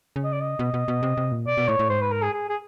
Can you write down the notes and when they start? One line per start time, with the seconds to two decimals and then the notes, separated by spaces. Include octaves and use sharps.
0.16 C#3
0.24 D#5
0.33 D5
0.41 D#5
0.59 B2
0.74 B2
0.88 B2
1.03 C3
1.17 C3
1.32 A#2
1.46 B2 D5
1.57 B2
1.68 A2 C#5
1.79 A2
1.90 G#2 C5
2.01 B4
2.12 A#4
2.22 G#4
2.34 G#4
2.49 G#4